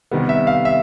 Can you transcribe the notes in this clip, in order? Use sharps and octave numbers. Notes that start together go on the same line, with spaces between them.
C3 D#3 G3 B3
E5
F5
E5